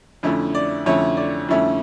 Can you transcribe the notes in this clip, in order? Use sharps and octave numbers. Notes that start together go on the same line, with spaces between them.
F2 D3 A3 C#4 E4
D5
F2 D3 A3 C#4 E4 C#5
D5
F2 D3 A3 C#4 E4